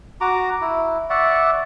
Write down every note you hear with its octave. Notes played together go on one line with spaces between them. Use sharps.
F#4 A#5 D6
E4
D5 E5 F#5 C#6